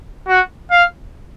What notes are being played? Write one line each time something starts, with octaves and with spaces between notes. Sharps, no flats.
F#4
F5